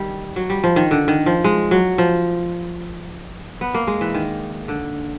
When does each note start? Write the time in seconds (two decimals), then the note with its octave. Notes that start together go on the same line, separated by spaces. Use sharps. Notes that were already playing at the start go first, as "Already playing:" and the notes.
Already playing: D#3 G3
0.36 F#3
0.50 G3
0.64 F3
0.76 D#3
0.91 D3
1.08 D#3
1.26 F3
1.44 G#3
1.71 F#3
1.98 F3
3.61 B3
3.74 A#3
3.87 G#3
4.01 E3
4.15 D#3
4.68 D3